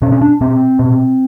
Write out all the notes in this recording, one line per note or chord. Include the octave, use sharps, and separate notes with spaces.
B2 C#4
C#4
D4
B2 C4
B2